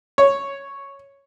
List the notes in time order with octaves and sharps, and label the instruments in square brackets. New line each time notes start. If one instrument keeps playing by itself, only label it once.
[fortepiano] C#5